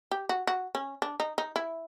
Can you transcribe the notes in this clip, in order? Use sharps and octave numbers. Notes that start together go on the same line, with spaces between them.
G4
F#4
F#4
C#4
D4
D#4
D#4
E4